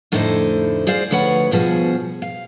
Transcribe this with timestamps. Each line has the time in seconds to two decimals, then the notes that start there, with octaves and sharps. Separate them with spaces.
0.12 F2 A2 D3 D#4 E4 C5
0.87 G#4 C5 D5 F5
1.11 D2 F3 B4 C#5 F#5
1.51 G2 B2 F3 G#4
2.22 F5